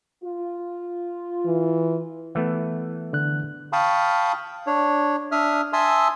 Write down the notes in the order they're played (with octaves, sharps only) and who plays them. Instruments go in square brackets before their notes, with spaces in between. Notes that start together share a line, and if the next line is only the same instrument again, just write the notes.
[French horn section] F4
[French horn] E3
[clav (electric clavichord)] E3 A3 B3
[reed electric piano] D3 F#6
[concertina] F5 G5 A5 B5 C#6 D#6
D4 C#5
D4 E5 D#6 F6
E5 G#5 A5 C6 D#6 E6